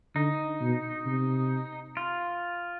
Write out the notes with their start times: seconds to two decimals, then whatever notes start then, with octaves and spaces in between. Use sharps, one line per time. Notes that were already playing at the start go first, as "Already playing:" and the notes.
0.15 D3 D#4
0.61 B2
1.06 C3
1.97 F4